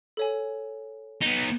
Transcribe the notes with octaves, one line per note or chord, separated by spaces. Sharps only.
A4 C#5 G#5
B3 D#4